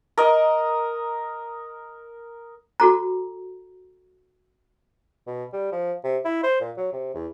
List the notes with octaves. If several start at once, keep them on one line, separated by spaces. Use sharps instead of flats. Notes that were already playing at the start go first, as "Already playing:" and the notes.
A#4 D#5
F#4 A4 A#5
B2
G3
F3
C3
E4
C5
A#2
F#3
C3
E2